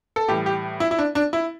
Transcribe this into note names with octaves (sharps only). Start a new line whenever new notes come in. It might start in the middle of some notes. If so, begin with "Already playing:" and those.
A4
A2 E3 G3 G4
G4
E4
E4
D4
D4
E4